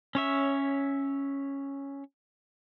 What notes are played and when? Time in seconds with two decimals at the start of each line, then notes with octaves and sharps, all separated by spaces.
0.15 C#4 C#5 E5